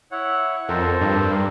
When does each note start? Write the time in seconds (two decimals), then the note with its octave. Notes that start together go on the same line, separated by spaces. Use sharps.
0.12 E4 C#5 F#5
0.69 F2 A4 A#4 C5
1.01 G2